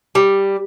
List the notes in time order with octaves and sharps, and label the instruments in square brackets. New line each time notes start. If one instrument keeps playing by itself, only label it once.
[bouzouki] G3